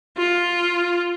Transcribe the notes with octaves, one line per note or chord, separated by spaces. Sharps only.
F4